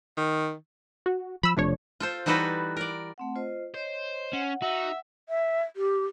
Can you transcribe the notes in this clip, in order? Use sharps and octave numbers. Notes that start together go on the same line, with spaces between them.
D#3
F#4
F3 B5 E6
E1 C3 F3 A3 D4 C#5
F4 A4 C5
E3 G3 D#4 F#4 A4 B4
A#4 D5
A3 C4 F#5
F4 C5 D#5
C5 C#5 D#5
C#4 F#5
D#4 F#4 E5
E5
G4